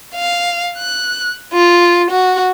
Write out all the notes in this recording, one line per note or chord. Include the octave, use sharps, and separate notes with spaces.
F5
F#6
F4
F#4